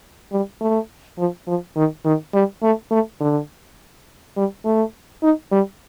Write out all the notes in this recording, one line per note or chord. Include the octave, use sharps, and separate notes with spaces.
G3
A3
F3
F3
D#3
D#3
G3
A3
A3
D3
G3
A3
D#4
G3